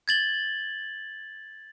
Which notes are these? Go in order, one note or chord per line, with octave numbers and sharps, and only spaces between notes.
G#6 A6 F#7 G7